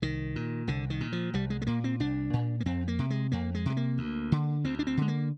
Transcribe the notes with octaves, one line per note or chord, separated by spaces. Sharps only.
C2 D#3
A#2
C2 D3
D#3
A#2
F3
C2 G3
G#3
G#3
A#2 A#3
C4
C2 D4
A#2
A#3
F2 C4
A#3
C3
G#3
F2 A#3
G#3
C3 G#3
A#3
D2
D3
D2 C4
D4
C4
D3 G#3
A#3